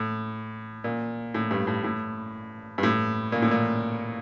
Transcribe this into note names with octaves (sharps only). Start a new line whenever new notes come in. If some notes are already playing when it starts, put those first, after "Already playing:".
Already playing: A2
A#2
A2
G2
A2
A2
G2
A2
A#2
A2
A#2